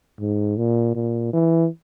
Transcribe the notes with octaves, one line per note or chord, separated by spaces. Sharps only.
G#2
A#2
A#2
E3